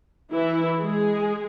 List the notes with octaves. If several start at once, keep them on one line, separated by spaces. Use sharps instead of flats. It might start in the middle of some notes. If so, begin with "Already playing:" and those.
E3 E4
G#3 G#4